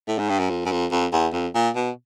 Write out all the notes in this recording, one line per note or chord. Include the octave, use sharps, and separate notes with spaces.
A2
G#2
G2
F#2
F2
F#2
F2
F2
E2
F2
A#2
B2